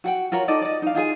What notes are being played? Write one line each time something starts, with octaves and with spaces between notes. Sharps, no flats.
F#4 F#5 G5
F4 F#4 A#4 C#5
D#4 A4 D5 D#5
D5 D#5
D#4 F5
D#4 F4 G#4 G#5